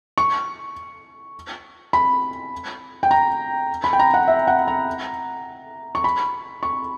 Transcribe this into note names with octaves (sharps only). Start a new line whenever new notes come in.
C#6
B5
G5
A#5
B5
G5
A#5
F#5
E5
F#5
A#5
C#6
B5
C#6